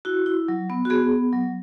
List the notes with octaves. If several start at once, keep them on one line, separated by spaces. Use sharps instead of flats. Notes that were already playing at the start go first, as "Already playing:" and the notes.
E4 F#4
E4
F#3
B3
F#4
B3 G#4
B3
F#3